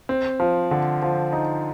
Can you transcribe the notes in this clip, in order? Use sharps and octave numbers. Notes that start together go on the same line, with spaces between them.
C4
F3
D3
F3
D#4